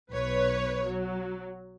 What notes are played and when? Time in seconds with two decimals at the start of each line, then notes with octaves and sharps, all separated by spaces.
0.11 B1 B4 C#5
0.87 F#3